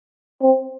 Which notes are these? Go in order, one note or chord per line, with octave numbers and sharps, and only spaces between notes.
C4